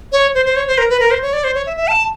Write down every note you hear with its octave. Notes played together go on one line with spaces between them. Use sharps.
C#5
C5
C5
C#5
C5
A#4
B4
A#4
C5
C#5
D5
C5
C#5
E5
E5
A5